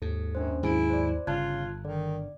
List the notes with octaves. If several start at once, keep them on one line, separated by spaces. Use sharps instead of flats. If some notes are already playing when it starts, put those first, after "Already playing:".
D#2 G#2 A4
F#2 C#4 D4 C5
G#2 D#3 F#3 E4 G#4 G#5 D7
C5 D5
G1 C#3 F4 A5 F#6 G#6
D3 D#3 D5